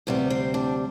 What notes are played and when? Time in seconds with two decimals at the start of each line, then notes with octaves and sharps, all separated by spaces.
0.07 D2 C3 G3 B3
0.30 C4
0.54 D4